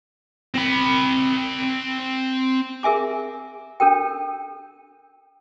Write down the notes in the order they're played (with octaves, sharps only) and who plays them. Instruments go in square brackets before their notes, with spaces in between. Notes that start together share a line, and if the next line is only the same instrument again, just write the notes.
[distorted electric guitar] C4 B5
[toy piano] G#4 A#4 E5 G#5 D6
D4 A4 A#4 G5